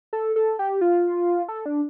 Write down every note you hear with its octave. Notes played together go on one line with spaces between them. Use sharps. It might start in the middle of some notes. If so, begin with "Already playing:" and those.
A4
A4
G4
F4
A4
D4